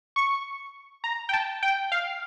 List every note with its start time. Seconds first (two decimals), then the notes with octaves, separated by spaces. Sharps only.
0.16 C#6
1.04 A#5
1.29 G5
1.33 A5
1.63 G5
1.92 F5